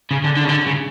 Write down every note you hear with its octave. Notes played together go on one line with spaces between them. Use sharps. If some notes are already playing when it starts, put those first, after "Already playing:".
C#3
D3
D3
C#3
D3
C#3